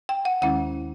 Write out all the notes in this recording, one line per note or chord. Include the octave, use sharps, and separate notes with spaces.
G5
F#5
D#2 D#3 G#3 C#4 E4 F#5